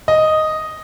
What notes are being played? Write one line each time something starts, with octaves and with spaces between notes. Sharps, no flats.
D#5